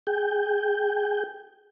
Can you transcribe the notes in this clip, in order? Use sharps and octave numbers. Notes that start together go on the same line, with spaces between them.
G#4 G5